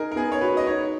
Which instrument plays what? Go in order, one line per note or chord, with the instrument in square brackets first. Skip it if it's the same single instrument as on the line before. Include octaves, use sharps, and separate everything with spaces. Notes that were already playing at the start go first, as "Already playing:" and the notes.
Already playing: [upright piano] D#4 [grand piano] G#4 A#4
[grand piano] A#4
[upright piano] B3 [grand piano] G#4
[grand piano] C#5
[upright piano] F#4 [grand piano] B4
[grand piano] D#5
[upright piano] D#4 [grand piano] C#5